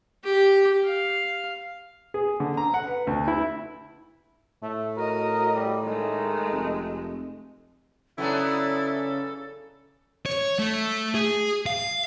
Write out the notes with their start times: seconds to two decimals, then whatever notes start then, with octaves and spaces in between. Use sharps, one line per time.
0.25 G4
0.85 F5
2.14 G#4
2.40 D3
2.57 A#5
2.74 F#5
2.87 B4
3.07 D2
3.28 E4
4.62 A2 A3
4.97 F#4 A#4 D#5
5.54 G3
5.83 D#3 G#3 A3
6.52 F1
8.18 C#3 F#3 B3 D4 E4 A4
10.26 C#5
10.59 A3
11.15 G#4
11.66 F5